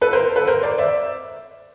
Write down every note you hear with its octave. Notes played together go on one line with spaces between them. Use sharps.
A4 B4
A#4 C5
A4 B4
A#4 C5
C5 D5
D5 E5